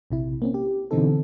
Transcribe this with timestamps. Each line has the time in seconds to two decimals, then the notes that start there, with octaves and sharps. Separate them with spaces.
0.10 A#1 C3 E4
0.42 A#3 C4 C#4
0.54 G4
0.91 B2 D3 E3 C4 D#4 A4